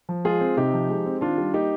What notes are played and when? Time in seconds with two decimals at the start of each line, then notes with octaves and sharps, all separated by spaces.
0.09 F3
0.25 G#3 F4 G#4
0.41 C4
0.57 C3 D#4 G4
0.74 F3
0.90 G#3
1.06 C4
1.21 D#3 D4 F4
1.38 G3
1.53 A#3 D#4 G4